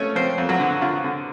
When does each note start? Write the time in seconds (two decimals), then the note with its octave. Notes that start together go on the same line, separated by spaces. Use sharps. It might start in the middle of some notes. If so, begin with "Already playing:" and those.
Already playing: F3 A3 C#4 C#5
0.15 F3 C4 C5
0.38 F2
0.49 F#3 F#4
0.60 D3
0.82 D3 F4
1.04 D3